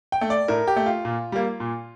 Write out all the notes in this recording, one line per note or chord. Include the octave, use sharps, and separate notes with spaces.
G5
A3
D5
A2 A#4
G4
A3
F4
A#2
G3 A#3
A#2